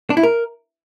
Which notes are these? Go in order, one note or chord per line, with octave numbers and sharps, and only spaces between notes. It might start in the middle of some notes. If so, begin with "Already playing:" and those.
D4
E4
A#4